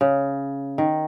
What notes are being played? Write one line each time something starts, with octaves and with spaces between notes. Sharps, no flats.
C#3
D#3